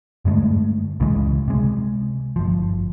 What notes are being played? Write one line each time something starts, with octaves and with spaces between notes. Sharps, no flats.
G2 D3 G#3 A3
C#2 C#3 E3 G#3
C3 G#3
G1 F3